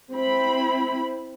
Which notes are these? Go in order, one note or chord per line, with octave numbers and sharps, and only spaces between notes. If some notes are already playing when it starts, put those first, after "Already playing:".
C4 E4 B5